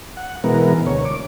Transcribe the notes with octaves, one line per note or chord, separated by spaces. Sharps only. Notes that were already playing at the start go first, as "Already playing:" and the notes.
F#5
B2 E3 G#3 B3 A#4
D2 C#5
D6